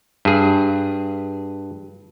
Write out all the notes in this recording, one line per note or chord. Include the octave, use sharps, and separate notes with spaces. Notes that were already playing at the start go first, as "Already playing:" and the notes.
G2 G#4